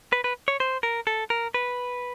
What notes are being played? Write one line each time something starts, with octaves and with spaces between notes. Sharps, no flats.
B4
B4
C#5
C5
A#4
A4
A#4
B4